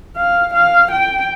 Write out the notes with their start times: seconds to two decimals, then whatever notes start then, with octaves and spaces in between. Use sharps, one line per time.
0.17 F5
0.54 F5
0.91 G5